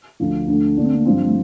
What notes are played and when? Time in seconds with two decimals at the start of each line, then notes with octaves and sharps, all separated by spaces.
0.20 D2 D3 F3
0.48 D2 D3 A3
0.77 D3 A3 A#3 D4
0.86 C4
0.95 A#3
1.05 G2 F3 C4
1.17 G3
1.26 A3